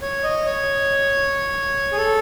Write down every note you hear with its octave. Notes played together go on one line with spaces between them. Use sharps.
C#5
D#5
C#5
G#4
A4